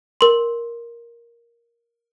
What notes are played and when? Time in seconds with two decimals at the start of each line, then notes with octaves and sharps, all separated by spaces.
0.21 A#4 C6